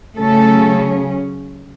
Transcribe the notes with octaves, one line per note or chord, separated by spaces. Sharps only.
C#3 F#3 A3 C#4 A4